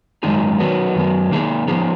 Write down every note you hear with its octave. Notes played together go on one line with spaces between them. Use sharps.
F#2 D#3 G#3 D#4 G#4
D#3 F#3 B3
F#2 D#3 F#3 B3
D#3 A#3 D#4 G#4
F3 B3 D#4 G#4